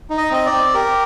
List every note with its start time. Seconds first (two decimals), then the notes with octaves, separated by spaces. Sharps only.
0.10 D#4
0.17 D#5
0.30 C4 D#5
0.46 D5
0.52 C4
0.74 G4 A#4